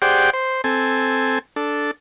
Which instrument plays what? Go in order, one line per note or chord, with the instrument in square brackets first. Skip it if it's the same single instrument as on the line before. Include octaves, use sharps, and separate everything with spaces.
[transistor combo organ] G4 G#4 C5 D5 F#5 G5
C5
C4 A4 G#5
D4 A4